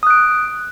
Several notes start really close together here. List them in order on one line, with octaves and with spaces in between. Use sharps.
D#6 F#6 D7